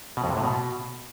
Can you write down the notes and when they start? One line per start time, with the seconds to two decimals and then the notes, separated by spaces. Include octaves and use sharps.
0.17 B2
0.24 F2
0.30 C3
0.37 A2
0.44 B2